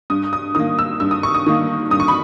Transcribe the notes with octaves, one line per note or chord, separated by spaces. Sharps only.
G2 D#6
D#6
D#3 A#3 D#6
E6
G2 E6
D#6
C#6
D#6
D#3 A#3
G2 D#6
C#6
B5